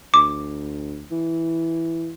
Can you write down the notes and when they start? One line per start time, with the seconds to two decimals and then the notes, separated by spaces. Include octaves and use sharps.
0.14 D2 D6
1.11 E3